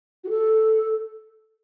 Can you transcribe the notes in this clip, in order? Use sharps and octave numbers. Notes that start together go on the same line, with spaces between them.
F#4
A4